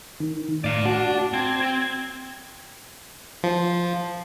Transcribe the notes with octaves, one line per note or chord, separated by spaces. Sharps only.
D#3
A2 D5 F5
D4 F#4
C4 G#6
F3